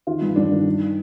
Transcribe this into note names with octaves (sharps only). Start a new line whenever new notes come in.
D#3 F4
G2
G2 D4
D#3
D#3